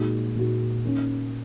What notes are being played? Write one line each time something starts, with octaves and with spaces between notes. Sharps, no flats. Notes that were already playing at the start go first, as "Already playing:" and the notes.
Already playing: A#2 G#3 D#4 F#4
A#2 G#3 D#4 F#4
D#3 A#3 C#4